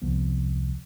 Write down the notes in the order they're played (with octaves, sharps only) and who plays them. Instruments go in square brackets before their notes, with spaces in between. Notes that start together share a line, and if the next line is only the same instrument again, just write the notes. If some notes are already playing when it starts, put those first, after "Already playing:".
[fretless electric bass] E1 C2 F3 B3